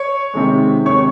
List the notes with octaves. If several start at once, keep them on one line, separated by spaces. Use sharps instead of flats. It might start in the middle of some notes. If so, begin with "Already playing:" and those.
Already playing: C#5 C#6
C3 D#3 G#3
C3 D#3 G#3 C#5 C#6